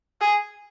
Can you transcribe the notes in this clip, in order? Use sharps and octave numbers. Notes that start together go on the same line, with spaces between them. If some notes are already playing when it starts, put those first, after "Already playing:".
G#4